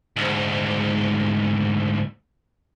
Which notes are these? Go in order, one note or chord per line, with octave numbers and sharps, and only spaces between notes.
D2 G#2